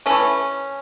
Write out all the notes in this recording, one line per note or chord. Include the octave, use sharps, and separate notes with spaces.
E3 A3 C#4